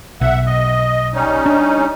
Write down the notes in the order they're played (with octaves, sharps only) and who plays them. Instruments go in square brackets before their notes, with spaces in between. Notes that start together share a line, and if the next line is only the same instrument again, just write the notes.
[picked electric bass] B1 [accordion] E5 F#5
[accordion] D#5
G3 C#4 D#4
[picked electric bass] D4